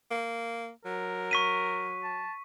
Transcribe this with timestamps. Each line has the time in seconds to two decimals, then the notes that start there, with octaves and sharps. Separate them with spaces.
0.11 A#3
0.85 F#3 A#4
1.31 C#6 B6 D#7
2.03 A5